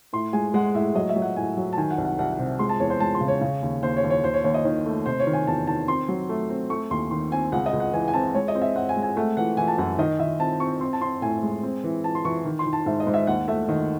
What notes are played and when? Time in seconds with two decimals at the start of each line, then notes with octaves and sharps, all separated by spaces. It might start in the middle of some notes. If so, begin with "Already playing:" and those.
0.13 A2 C6
0.33 G#3 G#5
0.54 G#3 F#5
0.75 A2 E5
0.95 F#3 D#5
1.09 E5
1.16 F#3
1.22 F#5
1.36 A2 G#5
1.57 F#3
1.73 A5
1.78 D#3 G#5
1.91 F#5
1.98 C2
2.05 F#5
2.19 C2 F#5
2.32 F#5
2.39 C3
2.59 G#3 C6
2.69 A5
2.80 E2 C#5
2.90 C5
3.00 G#3 A5
3.15 C6
3.21 C#3
3.28 C#5
3.41 C#3
3.62 D#2
3.83 D#2 C5
3.97 C#5
4.04 D#2
4.10 C#5
4.23 D#2 C5
4.34 C#5
4.44 D#2 C#5
4.54 D#5
4.64 D#3 C#5
4.86 A3
5.06 C3 C5
5.20 C#5
5.27 D#3
5.33 G#5
5.47 E2 A5
5.67 D#3 A5
5.88 C4 C6
6.08 F#3
6.29 A3
6.49 C4
6.70 A3 C#6
6.91 D#2 C6
7.11 D#3 C6
7.32 C4 G#5
7.52 C#2 F#5
7.66 D#5
7.73 C#2
7.80 F#5
7.93 E3 G#5
8.08 G#5
8.14 C4 A5
8.35 G#3 C#5
8.48 D#5
8.55 C4
8.62 E5
8.76 C4 F#5
8.89 G#5
8.96 G#3
9.03 G#5
9.17 A3 F#5
9.37 E3 F#5
9.57 E3 G#5
9.68 A5
9.78 F#2 F#5
9.99 D#3 D#5
10.19 D#3 E5
10.40 C4 A5
10.60 C4 C#6
10.81 C4 C6
10.93 A5
11.01 C4 C6
11.22 A2 G#5
11.43 G#3
11.63 C4
11.84 E3
12.04 E3 A5
12.15 C6
12.25 E3 C#6
12.45 D#3
12.59 C6
12.66 D#3
12.73 A5
12.86 G#2 E5
13.00 D#5
13.07 G#2
13.14 E5
13.27 D#2 F#5
13.48 A3 E5
13.68 D#3 D#5